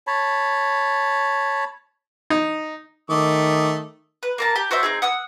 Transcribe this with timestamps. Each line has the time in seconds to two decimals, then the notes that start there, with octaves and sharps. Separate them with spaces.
0.07 C#5 A5 B5
2.30 D#4
3.10 D#3 A3 D6 D#6
4.23 B4
4.38 A#3 A#4 A5
4.56 G4
4.71 F#4 C5 D5 E5
4.83 C4 D#4 G#4
5.02 F#5 D#6 E6